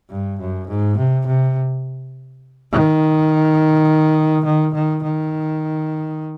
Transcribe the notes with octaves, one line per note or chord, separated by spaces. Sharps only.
G2
F#2
G#2
C3
C3
D#3
D#3
D#3
D#3